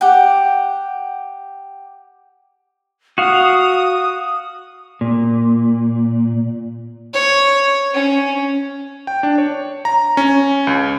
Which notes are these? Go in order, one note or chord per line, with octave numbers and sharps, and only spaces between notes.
G4 F#5 G5
F#4 F5 F#5 D#6
A#2
C#5
C#4
G5
D4
C#5
A#5
C#4
C#2